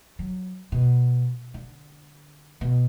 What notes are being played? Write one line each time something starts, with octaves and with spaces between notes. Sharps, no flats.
F#3
B2
D3
B2